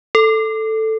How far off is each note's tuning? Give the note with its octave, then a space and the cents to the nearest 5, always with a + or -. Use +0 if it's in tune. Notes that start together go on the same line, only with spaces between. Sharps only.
A4 +5